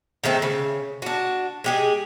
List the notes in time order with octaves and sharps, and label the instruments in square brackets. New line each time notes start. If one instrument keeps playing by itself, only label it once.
[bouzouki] D#3 G#3 A3 C4
C#3
D4 F#4
G#3 G4 G#4